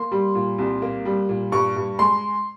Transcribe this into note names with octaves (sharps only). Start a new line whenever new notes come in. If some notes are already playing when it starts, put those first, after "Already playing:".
Already playing: A#3 C6
G3
A#2
C2
A#3
G3
A#2
G2 C#6
G2
G#3 C6